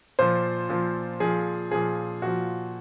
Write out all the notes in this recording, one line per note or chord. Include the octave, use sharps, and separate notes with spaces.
A#2 F3 C5
A#2 F3
A#2 F3 G#4
A#2 F3 G#4
A#2 F3 F#4